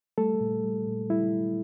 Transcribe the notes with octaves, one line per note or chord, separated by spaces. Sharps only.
G3 A3 A4
A#2
G3
A#2
G3 E4